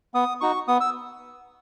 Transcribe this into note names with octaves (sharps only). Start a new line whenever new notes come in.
B3 D#6
D#4 F#4 C#6
B3 D#6
E6